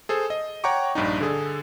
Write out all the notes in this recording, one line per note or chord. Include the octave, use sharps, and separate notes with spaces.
G#4 A4 C5
D#5
C#5 F#5 G5 A#5 C#6 D6
A#1 G2 D4 D#4
D3 G#4 A4